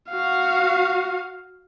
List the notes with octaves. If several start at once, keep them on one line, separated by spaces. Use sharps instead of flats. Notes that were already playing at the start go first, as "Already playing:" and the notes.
F#4 F5